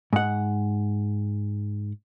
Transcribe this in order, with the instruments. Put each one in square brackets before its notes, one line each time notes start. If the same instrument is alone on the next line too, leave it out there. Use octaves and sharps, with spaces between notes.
[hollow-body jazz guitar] G#2 F#5